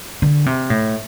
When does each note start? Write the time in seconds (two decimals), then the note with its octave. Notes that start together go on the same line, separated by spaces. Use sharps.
0.22 D3
0.46 C3
0.70 A2